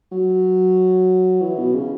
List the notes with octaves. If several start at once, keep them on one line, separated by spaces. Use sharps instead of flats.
F#3
E3
B2
C#3